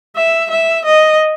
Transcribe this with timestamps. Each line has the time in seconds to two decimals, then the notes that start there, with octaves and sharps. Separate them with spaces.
0.16 E5
0.50 E5
0.85 D#5